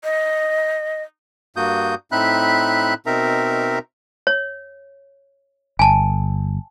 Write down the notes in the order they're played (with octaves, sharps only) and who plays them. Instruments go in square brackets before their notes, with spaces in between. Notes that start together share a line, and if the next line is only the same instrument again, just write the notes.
[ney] D#5
[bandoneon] G2 A#3 F#4 D#6 G6
A2 C4 D#4 E5 B5 F#6
B2 C4 D#4 A#4 E5 A#5
[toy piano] C#5
[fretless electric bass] G1 [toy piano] G#5 A5